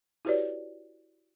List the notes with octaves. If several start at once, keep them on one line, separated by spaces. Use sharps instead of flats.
E4 F#4 G4 B4 C#5 D5